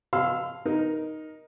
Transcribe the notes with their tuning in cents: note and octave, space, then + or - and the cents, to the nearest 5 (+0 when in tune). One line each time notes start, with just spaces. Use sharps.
F5 +0 C6 -45 E6 +0
D#4 +0 A#4 +15